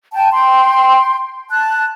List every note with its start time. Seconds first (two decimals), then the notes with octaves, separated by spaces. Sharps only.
0.13 G5 A5
0.33 G5 C6
1.50 A5 F#6